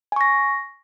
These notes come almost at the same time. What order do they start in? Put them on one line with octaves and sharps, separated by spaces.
G#5 C#6 A#6